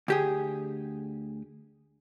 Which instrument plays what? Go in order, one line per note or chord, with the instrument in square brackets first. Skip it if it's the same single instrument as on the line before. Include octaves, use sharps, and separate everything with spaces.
[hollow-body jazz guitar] D2 G4 G#4